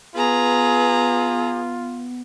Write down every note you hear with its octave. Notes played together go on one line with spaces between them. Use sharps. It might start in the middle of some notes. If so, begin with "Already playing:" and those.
B3 F4 G#4 B4 A#5